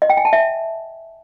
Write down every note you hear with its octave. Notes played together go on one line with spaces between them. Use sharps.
D#5
G5
G#5
A5
E5